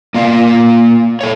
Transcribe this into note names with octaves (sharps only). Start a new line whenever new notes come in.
A#3 F4 D5 F5
A4 C#5